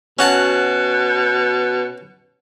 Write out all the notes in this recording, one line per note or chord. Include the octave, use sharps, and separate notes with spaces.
B2 C#4 F#4 A5